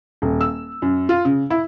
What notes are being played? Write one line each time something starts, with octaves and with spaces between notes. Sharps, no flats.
D#1
E6
F#2
F4
C#3
E4